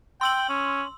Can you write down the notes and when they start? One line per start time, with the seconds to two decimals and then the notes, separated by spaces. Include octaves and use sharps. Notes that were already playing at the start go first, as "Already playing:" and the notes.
0.21 G5 C6 E6 F#7
0.49 C#4